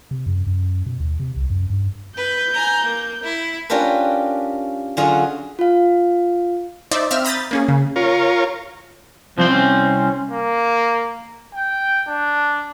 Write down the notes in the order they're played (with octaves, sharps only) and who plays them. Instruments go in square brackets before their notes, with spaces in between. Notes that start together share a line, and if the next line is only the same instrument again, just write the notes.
[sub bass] C3
F#2
F#2
B2
D#2
C3
C2
F#2
G2
[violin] B4 [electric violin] G6
[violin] G#5 A#5
A#3
E4
[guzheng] C#4 D4 F4 G4 A#4 B4
D3 F#3 C#4 F4 G#4
[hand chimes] F4 F5
[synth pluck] D#4 C5 D5 E5
C4 E5 F5 F6 E7
A#5 B5 D#6 G6 A6
A#3 C#4 G#4
C#3
[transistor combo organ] F4 A#4 C#5
[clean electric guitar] C2 C4 C5 [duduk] F3
[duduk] C#4
[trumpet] A#3
G5
D4